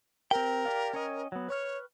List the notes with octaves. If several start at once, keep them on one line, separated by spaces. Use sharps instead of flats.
C4 G4 A#4 G5
G4 D5 F5
C#4 C#5 D#5
F#3 B3
B4 C#5 C#6 F6